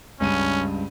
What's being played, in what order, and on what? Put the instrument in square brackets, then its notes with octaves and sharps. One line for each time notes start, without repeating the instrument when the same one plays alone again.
[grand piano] C#2 G2 D#7 [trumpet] C#4